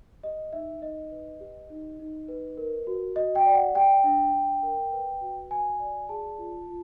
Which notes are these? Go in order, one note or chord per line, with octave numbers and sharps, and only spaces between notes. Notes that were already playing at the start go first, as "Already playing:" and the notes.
G4 D#5
D#4 E5
D#4 D#5
B4
G4
D#4
D#4
B4
A#4
F#4
F#4 D#5
G5
D5
F#5
G4 G5
D4
D4
A#4
B4
F#4
F#4 G#5
D5
G#4 A5
F4
F4